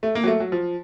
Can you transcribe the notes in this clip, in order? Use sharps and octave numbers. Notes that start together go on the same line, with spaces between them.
A3
A#3
F#3
A3
F#3
F3